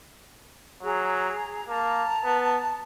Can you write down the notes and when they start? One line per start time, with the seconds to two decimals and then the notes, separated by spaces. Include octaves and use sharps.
0.83 F#3 G#4 A#5
1.68 A#3 A5 A#5
2.25 B3